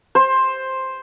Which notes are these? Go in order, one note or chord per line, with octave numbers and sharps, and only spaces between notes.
C5